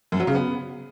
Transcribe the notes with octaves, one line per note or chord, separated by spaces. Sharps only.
F#2
F#3
C#3
B3